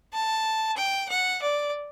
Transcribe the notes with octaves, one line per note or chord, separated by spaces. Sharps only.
A5
G5
F#5
D5